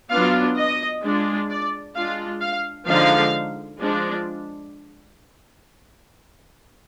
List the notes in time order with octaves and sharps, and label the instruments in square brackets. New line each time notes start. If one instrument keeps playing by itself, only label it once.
[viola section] F#3 B3 D4 F4 F5
D#5
G#3 D4 F4
D5
G#3 D4 F4 F5
F5
D3 F3 G#3 D#4 F5
F3 G#3 D4 F4